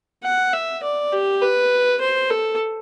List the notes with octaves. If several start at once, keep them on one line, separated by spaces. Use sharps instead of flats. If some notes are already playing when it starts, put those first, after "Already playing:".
F#5
E5
D5
G4
B4
C5
A4